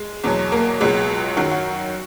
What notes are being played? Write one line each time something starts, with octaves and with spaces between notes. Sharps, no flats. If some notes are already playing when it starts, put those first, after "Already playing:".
Already playing: G#3
E2 B2 F#3
A#3
C#2 B2 F#3 G#3
F#2 D#3 F#3 F#4
F#4